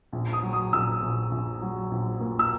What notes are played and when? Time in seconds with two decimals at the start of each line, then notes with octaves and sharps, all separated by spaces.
0.13 A#1
0.33 D#6
0.42 F#3
0.53 D#6
0.73 A#1 E6
1.02 A#1
1.31 A#1
1.61 F#3
1.91 A#1
2.20 A#2
2.39 E6